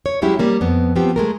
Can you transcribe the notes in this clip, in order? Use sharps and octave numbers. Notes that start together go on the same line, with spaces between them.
C#5
F#3 G#3 C#4 E4 G4
G3 A#3 C#4
F2 B3
F3 B3 C4 G4
G#3 A3 A#4